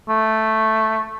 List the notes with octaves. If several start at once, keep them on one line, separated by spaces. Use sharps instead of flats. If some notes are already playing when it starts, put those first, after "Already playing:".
A3